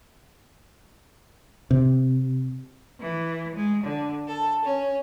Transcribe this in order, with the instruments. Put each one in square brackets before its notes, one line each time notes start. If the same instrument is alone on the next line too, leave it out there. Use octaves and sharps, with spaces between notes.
[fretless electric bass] C3
[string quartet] E3
G#3
D3
A4
C#4